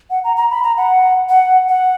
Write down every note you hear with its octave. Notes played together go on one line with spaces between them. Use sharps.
F#5
A#5
A#5
B5
A#5
F#5
F#5
F#5